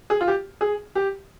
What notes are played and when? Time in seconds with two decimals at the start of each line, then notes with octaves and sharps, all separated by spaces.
0.10 G#4
0.21 F4
0.28 G4
0.61 G#4
0.95 G4